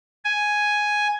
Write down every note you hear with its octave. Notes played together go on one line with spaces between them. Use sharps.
G#5